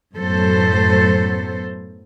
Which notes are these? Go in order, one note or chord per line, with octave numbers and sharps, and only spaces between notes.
F#2 A2 F#3 B3 A4 C5